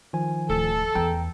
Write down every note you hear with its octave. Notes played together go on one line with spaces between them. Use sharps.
D#3 F3 G#5
D1 A4
E2 G5 A#5